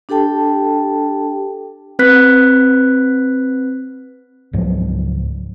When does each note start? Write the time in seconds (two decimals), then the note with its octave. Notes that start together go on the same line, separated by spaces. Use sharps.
0.09 D4 G4 A4 G5 A5
1.99 C4 B4 F#6 B6
4.53 C#2 G#2 F3 F#3